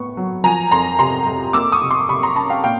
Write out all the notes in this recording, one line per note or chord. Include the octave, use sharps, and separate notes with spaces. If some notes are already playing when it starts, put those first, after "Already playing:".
Already playing: A2 B3 C#6
F#3
F3 G#5 A#5
F2 A#5 C6
C3 A#5 C6
F2
A#3 D6 E6
C#6 D#6
C3
C6 D6
C3 B5 C#6
A#5 C6
C#4 A5 B5
F5 G5
A#2 F5 G5